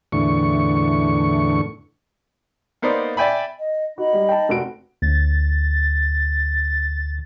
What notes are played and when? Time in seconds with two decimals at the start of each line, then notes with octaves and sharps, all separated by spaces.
0.12 E2 A2 D3 C#6
2.82 A#3 B3 D#4 C5 D5
3.17 D5 E5 G5 G#5 B5
3.59 D#5
3.98 D#4 F#4 D#5 B5
4.13 G3
4.29 G5 A5
4.49 F1 F#4 D7
5.02 D2 A6